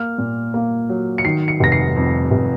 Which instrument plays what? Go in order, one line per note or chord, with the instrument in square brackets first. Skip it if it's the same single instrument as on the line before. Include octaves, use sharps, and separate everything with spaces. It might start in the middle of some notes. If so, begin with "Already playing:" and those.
Already playing: [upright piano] A#3 F6
A#2
A#3
F#3
C#7
D#3 C7
C#7
F1 A#6
C7
F2
F1